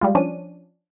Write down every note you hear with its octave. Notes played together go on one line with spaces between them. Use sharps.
G3 G#3 F4
F3 C#4 D4 D#7